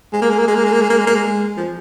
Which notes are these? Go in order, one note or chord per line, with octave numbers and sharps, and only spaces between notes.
G#3
A#3
G#3
A#3
G#3
A#3
G#3
A#3
G#3
A#3
G#3
A#3
G#3
F3